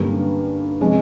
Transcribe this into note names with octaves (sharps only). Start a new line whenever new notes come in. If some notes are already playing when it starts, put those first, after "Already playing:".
Already playing: G2 D3 G3 A#3 C#4
C3 F3 G#3 C#4